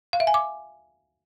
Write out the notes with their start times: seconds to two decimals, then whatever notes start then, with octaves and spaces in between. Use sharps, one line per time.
0.13 F5
0.20 E5
0.27 G#5
0.34 D6